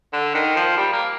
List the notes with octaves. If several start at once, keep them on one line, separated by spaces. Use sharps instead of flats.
D3
D#3
F3
G3
A#3